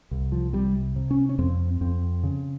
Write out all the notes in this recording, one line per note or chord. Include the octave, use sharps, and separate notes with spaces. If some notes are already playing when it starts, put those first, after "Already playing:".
C2
F3
C3 G3
C3
C#4
C#4
F2 C4
F2 C4
C#3